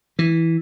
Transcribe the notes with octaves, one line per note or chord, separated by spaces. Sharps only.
E3